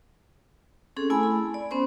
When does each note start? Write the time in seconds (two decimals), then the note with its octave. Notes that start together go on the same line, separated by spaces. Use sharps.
0.96 C4 C#4 G#4 A4
1.10 A3 E4 G#5 B5
1.23 B5
1.54 D5
1.71 B3 C#4 C5 C6